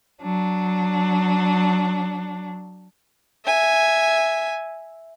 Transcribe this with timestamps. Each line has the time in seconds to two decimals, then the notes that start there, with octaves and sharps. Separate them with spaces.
0.21 F#3 D4
3.46 E5 G#5